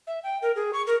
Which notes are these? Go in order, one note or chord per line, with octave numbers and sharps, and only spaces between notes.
E5
G5
A#4
G#4
C#6
A#4